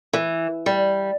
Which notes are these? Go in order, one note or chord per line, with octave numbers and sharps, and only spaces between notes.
E3
G3